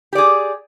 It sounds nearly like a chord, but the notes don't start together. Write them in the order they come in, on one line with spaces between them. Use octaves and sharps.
G4 D5 G#4